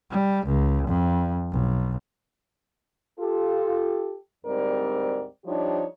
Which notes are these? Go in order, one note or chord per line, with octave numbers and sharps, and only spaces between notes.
G3
C#2
F2
B1
F4 G4 A4
D2 G#2 G3 C4 A#4 D5
F3 G3 D4 D#4 G4 C#5